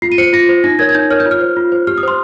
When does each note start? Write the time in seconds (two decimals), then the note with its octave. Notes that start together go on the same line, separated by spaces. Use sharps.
0.02 F4 C7
0.12 D#7
0.18 C5 C#7
0.33 F4 A#6
0.49 C5
0.64 D#4 A#6
0.79 A#4 C#5 G#6
0.89 G#6
0.95 D#4 G6
1.10 A#4 C#5 F6
1.20 G6
1.26 F4
1.31 F6
1.41 C5
1.57 F4
1.72 C5
1.87 G4 F6
1.98 D#6
2.03 C5 C6